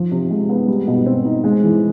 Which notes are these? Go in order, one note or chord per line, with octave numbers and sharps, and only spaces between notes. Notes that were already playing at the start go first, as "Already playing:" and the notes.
Already playing: F3
C3
G#3
B3
G3
B2
C4
D#4
G#3
E3